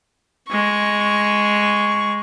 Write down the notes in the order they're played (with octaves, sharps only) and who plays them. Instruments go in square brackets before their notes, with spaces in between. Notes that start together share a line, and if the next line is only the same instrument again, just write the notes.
[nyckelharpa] G#3 C#6